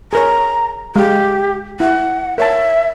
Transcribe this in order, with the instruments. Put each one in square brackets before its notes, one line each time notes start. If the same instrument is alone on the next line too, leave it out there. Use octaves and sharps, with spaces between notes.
[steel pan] G#4 A#4 C#5 [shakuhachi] A#5
[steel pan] G#3 F5 [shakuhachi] G4
[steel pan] E4 [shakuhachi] F#5
[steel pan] A#4 C#5 A5 [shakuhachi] E5